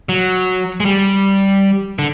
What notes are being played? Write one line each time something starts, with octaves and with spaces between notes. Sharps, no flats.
F#3
G#3
G3
D3